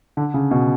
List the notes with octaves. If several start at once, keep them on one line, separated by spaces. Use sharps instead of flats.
D3
C#3
B2